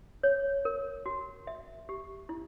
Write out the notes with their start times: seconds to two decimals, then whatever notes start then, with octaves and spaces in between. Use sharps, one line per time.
0.23 C#5
0.65 A#4
1.06 F#4
1.47 E5
1.89 G4
2.29 E4